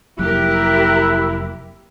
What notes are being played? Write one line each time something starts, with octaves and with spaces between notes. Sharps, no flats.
F1 F#3 A#3 E4 G4 A#4 F#6